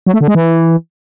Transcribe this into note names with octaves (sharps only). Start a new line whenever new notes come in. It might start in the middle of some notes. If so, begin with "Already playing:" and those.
F#3
A3
D3
G#3
E3